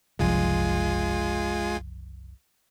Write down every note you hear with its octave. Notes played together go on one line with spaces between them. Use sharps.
F#1 C2 F3 G#3 F4 G#5